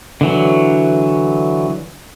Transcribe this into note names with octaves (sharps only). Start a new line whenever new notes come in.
D3 E3 F#3